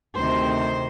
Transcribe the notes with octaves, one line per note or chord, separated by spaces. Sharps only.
D2 C3 D#3 C5